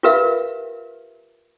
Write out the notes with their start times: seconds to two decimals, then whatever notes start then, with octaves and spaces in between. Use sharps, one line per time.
0.03 F4 G4 A#4 B4 E5 F5